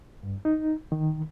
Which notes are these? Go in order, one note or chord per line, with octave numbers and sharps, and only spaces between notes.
G2
D#4
D#3